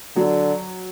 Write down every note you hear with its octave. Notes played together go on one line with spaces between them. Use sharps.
D3 F#3